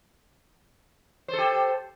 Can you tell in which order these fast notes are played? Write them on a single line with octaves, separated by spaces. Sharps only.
C5 A4 G4